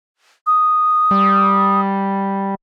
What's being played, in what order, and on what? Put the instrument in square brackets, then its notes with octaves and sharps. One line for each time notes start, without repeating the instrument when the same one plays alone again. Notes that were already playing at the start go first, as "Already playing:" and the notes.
[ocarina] D#6
[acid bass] G3